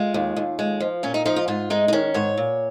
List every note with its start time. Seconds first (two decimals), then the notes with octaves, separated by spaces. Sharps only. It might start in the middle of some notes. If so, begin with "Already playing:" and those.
Already playing: G#3 F4
0.14 D#2
0.36 D#2
0.59 G#3
0.80 F3
1.03 A#2 C#4
1.14 D#4
1.26 F3 D#4
1.36 F4
1.48 G#2 F4
1.70 G#3 D#4
1.88 D#4
1.93 D#3 C#4
2.14 G#2 C#5
2.38 A#2